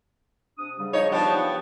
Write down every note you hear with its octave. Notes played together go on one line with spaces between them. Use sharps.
C3 D4 D#6
G#2 C#3 G3
F3 D#4 C#5
F3 B3 D4 G4 A5
F#5